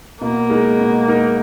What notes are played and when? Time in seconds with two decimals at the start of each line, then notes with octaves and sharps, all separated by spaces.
0.21 B2 A#3
0.50 G#3 D#4 A#4
0.79 B2
1.07 G#3 D#4 A#4